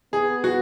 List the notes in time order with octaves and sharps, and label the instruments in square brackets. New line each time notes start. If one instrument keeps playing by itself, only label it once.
[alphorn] B3 [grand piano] G#4
[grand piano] F#4